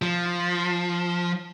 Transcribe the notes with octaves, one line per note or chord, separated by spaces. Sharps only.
F3